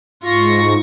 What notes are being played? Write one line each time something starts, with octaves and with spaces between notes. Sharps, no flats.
G#2 F4 C#6 A#6